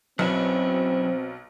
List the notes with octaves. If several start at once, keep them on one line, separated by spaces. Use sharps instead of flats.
B1 F#3 C4 C#4 E4